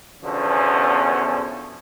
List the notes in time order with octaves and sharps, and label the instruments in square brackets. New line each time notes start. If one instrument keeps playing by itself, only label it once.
[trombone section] E2 B2 D3 F3 C#4